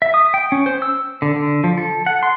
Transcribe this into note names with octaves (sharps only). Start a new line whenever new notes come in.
E5
D#6
G5
C#4
C5
E6
D3
D3
F3
A4
F#5
C6